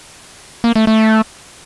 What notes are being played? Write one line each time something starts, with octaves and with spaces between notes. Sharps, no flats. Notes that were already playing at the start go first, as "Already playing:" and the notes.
A#3
A3
A3